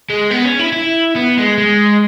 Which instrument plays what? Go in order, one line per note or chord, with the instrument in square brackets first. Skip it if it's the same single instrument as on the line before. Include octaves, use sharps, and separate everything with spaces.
[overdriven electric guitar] G#3
B3
C#4
E4
E4
B3
G#3
G#3